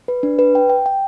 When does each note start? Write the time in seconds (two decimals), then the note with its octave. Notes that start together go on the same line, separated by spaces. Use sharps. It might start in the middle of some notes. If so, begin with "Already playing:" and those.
0.08 B4
0.23 D4
0.39 B4
0.55 G5
0.70 G5
0.86 G5